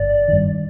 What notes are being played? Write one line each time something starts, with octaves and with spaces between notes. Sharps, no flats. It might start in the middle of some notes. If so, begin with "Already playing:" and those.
Already playing: G1 D5
G2 D#3